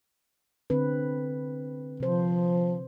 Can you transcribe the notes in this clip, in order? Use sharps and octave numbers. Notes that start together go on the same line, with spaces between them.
D3 C4 B4
C3 F3 C5